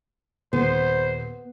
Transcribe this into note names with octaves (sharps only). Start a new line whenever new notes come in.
D#1 B3 C5